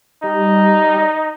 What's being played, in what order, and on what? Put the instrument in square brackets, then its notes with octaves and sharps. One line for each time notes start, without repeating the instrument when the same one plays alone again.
[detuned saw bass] G3 [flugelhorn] D#4